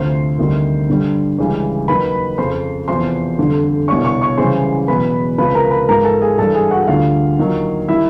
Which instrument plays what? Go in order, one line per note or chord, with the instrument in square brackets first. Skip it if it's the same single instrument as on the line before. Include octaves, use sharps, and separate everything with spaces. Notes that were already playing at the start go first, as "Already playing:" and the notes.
Already playing: [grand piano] D2 C3 F3 C5 C6
D2 C3 D#3 G3
G2 D3 G3
C#2 C#3 E3 G3
D#2 D#3 F#3 B4 B5
F2 C#3 F3 C5 C6
E2 C3 F3 C5 C6
F2 D3 G3
C2 B2 G3 C#5 C#6
C#5 C#6
C#5 C#6
F#2 C#3 E3 G3 C5 C6
E2 B2 F#3 B4 B5
C#2 C3 F3 B4 B5
A#4 A#5
B4 B5
G#2 F3 A#4 A#5
A4 A5
G#4 G#5
G2 E3 G3 A4 A5
G#4 G#5
F#4 F#5
D2 D3 G3 F4 F5
D#2 D#3 F#3
D#3 G3 E4 E5